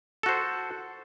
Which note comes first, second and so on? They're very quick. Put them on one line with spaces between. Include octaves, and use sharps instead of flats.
A4 F#4 C5